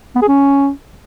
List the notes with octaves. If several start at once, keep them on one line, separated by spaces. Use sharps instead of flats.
B3
G#4
C#4